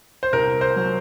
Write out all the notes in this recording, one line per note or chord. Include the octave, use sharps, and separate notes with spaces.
C5
C2 A#4
C5
F#3